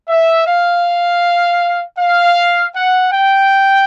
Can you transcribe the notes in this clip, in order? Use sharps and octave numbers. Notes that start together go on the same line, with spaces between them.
E5
F5
F5
F#5
G5